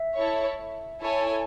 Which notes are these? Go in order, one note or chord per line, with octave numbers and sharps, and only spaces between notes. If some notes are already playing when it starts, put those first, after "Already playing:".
Already playing: E5
E4 A4 C#5
E4 A4 C#5 G#5